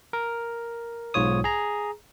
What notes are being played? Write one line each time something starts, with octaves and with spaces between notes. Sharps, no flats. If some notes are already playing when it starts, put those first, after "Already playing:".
A#4
B1 G#2 F4 C#5 D#6
G#4 A#5